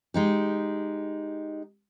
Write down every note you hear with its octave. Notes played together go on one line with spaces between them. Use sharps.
G#3 D#4 G4